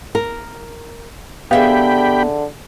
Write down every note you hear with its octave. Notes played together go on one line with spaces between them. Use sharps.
A#4
D3 B3 G4 G#4 E5 F5 G5 B5